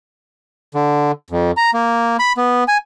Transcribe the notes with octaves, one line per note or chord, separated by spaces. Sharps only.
D3
F2
A#5
A#3
B5
B3
G#5